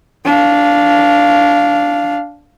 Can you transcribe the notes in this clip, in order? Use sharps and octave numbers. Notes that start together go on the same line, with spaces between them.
D4 F5